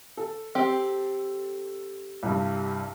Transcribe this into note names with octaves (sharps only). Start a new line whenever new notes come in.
A4
C4 G4
C2 G2